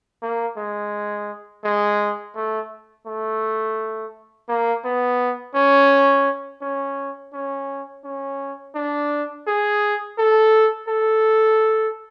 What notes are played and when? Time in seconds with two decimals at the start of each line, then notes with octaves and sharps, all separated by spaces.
0.22 A#3
0.57 G#3
1.65 G#3
2.35 A3
3.07 A3
4.49 A#3
4.85 B3
5.55 C#4
6.62 C#4
7.34 C#4
8.04 C#4
8.75 D4
9.47 G#4
10.19 A4
10.88 A4